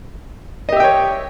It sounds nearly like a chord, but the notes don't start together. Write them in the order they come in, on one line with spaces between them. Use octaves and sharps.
D#5 G4 E5 G5 C#5